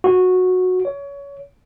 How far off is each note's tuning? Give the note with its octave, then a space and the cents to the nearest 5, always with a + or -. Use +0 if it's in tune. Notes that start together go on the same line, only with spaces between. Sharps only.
F#4 -15
C#5 +25